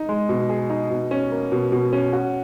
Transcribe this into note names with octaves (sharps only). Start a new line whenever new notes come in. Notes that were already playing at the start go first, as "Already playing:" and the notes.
Already playing: D#4
G#3
B2
G#4
D#4
B2
C#4
A#3
B2
B2
C#4
F#4